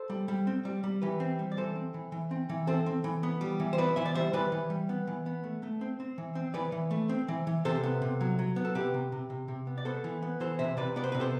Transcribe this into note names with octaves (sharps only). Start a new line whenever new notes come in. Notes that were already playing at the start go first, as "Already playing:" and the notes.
Already playing: A4 C5
G3
G3
C4
G3
G3
E3 G4 B4
C4
G3
D5
E3 A4 C5
C4
E3
E3
C4
E3
C4 A4 C5
C4
E3
B3
G3
E3
C5
B3 B4 D5
E3 C5 E5
D5
G3 C5 E5
E3 B4 D5
E3
G3
B3
E3
B3
A3
A3
C4
C4
E3
C4
E3 B4 D5
E3
A3
C4
E3
E3
C3 A4 C5
B3
C3
F#3
F#3
B3
A4
C3 G4 B4
C3
C3
C3
C3
B3
D5
B3 A4 C5
E3
B3
E3 A4 C5
C3 C5 E5
C3 B4 D5
B3 D5
C5
C3 B4
A4 C5